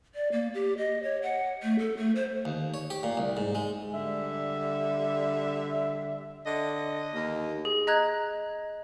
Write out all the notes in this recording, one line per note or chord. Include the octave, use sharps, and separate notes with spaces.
D5
A#3
G4
D#5
C#5
F#5
A3
A4
A3
C5
D#2
C#5
G4
A#2
C2
G#2
G#3
D3 G3 E5
D3 D#5
D#2
G#4
D#5 A#5 F#6 G#6